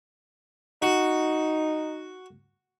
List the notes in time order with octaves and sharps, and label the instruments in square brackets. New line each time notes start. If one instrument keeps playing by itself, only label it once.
[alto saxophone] D#4 [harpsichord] F#4